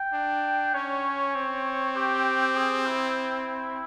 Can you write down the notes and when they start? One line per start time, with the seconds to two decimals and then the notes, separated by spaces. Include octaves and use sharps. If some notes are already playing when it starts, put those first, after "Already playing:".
Already playing: G5
0.13 D4
0.74 C#4 C#5
1.35 C4
1.96 G4
2.56 G#4
2.86 E4